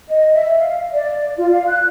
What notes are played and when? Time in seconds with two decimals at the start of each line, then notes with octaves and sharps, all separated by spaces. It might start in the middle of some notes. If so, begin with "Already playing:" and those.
0.08 D#5
0.33 E5
0.57 F5
0.93 D5
1.36 F4
1.51 F5
1.67 F#6